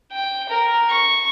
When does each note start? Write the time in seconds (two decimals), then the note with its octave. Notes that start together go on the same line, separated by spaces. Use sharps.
0.12 G5
0.49 A#4
0.89 C#6